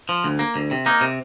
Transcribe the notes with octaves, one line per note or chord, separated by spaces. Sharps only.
F3
D2
A#3
D2
C3
A#3 D#4
C3